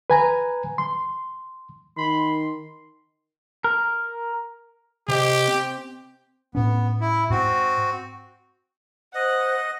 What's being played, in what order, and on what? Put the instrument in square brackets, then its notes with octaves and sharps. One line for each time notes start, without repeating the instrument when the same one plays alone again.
[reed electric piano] B4 G#5 A#5
C6
[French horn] D#3 [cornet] B5 [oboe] C6
[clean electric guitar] A#4
[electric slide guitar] C3 C5 D#5 [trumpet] G4
[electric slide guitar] C4 G5
[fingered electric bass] A2 C#4 [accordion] B3
[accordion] E4
[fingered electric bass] G#2 [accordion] C4 F#4
[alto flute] C5 [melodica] D#5 [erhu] F#5